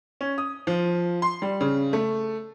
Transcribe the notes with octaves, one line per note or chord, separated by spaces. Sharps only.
C#4
D#6
F3
C6
G3
C#3
A3